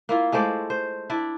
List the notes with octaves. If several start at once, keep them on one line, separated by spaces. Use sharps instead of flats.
A#3 E4 F4
G#3 A3 C5 D5
C5
D4 E4 D5